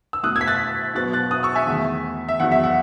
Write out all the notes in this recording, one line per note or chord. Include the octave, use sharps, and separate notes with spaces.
E6
B2 A3 D#6 F#6
E6 G#6
B6
F#6 A6
B2 F#3 B3 F#6 A6
F#6 A6
D#6 F#6
C#6 E6
E5 G#5
E2 D#3 A3
E5
E2 D#3 F#3 F#5
E5
F#5